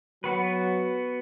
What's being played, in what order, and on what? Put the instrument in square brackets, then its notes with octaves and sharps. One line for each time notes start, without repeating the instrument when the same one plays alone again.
[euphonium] F#3 [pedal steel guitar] B3 F#4 B4